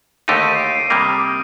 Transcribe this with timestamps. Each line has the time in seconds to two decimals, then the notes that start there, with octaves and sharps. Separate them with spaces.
0.28 D#2 D3 A3 D#4 G4 D#7
0.44 D#7
0.55 C7
0.59 D7
0.75 C7
0.90 C3 G3 A#3 D#6
1.01 D#6
1.10 D6
1.21 D#6